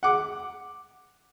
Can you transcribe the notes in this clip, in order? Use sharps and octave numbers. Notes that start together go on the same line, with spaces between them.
F#5 D6